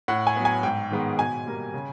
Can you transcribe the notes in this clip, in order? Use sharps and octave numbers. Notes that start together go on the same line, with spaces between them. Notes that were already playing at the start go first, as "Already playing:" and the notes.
A2 F#5
G#5
F#3 B3
G#5
G#2 G5
D#3 G#3 B3
B2 G#5
G3 A#3
C#3